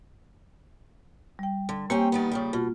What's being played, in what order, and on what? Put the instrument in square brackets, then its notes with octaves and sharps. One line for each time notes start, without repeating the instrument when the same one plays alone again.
[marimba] G3 G5
[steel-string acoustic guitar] D3
[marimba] A#3 G4 [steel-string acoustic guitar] C4 C#4 G5
[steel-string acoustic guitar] D#3 G3 B3
C#3 F3 G3
[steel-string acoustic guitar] B2 [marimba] F4